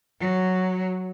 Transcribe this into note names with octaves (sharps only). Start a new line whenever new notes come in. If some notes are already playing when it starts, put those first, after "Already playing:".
F#3